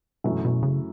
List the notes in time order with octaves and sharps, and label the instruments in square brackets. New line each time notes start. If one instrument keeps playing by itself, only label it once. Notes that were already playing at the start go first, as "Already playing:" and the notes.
[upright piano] F#2 E3 A3 E4 [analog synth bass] B2
[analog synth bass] B2
C#3